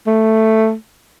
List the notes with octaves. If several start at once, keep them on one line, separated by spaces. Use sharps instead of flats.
A3